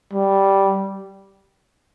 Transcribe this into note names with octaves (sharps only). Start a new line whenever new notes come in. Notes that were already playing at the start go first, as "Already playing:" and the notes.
G3